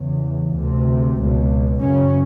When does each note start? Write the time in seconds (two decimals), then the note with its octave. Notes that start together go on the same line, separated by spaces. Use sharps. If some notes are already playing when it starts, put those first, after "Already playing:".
Already playing: E2 C#3
0.55 D2 C3
1.19 C#2 B2
1.81 F#2 C#3 C#4